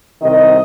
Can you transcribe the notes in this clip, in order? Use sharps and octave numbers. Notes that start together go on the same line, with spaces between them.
C2 C3 D#3 D#5